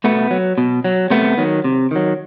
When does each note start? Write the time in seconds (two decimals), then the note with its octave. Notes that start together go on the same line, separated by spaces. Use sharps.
0.04 B2 A3 B3
0.31 F#3
0.58 B2
0.84 F#3
1.10 C3 A3 B3
1.38 D#3 F#3
1.64 C3
1.91 D#3 F#3